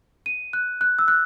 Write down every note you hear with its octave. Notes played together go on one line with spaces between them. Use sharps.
D#7
F#6
F#6
E6
F#6